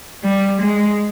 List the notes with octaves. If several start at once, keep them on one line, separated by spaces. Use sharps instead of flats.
G3
G#3